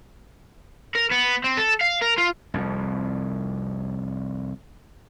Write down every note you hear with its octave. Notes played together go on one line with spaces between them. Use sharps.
A#4
B3
C4
A4
F5
A#4
F4
C2 F2